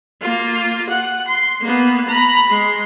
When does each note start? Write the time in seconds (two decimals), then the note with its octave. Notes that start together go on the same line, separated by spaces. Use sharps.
0.21 A#3 F4
0.90 F#5
1.27 C6
1.61 A#3 B3
2.08 A#5 B5
2.50 G#3 C6